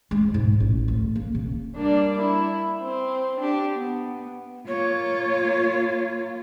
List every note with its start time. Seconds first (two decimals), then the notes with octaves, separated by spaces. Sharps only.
0.11 G#3
0.34 G#2
0.60 A1
0.88 D2
1.16 A#3
1.35 C#3
1.76 G3 A#3 D4 D5
2.20 E4
2.82 C4
3.41 D4 G4
3.75 B3
4.68 A#3 F4 C#5